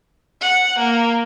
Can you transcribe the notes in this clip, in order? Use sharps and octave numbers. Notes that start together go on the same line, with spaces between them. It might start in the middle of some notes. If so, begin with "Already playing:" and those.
F#5
A#3